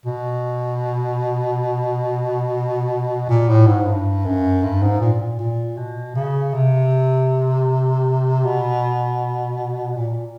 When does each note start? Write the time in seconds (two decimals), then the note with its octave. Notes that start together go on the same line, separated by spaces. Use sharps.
0.05 B2
3.29 A#2
3.49 A2
3.67 G#2
3.87 G2
4.25 F#2
4.63 G2
4.82 G#2
5.01 A#2
5.20 A#2
5.39 A#2
5.77 B2
6.15 C#3
6.54 C3
8.44 B2
9.97 A#2